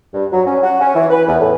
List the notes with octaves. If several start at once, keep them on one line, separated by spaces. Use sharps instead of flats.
G2
F#3
C#4
F#4
C#4
E3
B4
E2
A2